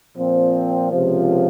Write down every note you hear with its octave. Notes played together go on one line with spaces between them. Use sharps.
A#2 F3 C4
C#2 C3 F3